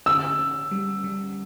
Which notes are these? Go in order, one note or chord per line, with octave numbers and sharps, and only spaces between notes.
D3 E6
C#4
G3
G3